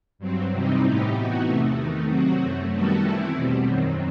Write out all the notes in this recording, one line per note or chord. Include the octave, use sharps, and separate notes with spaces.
G2 F#3 C4
C3 E3 G3 C4 D#4
A2 E3 B3 D#4 G4
E3 B3 D#4 F#4
E2 C3 E3 A3
D#3 A3 D#4
C3 F#3 C4 F#4
F#2 F#3 A3
D#3 G3 B3 F#4 A4
E3 A3 C4 E4
E2 B2 G3 C4
F#2 D#3 F#3 C4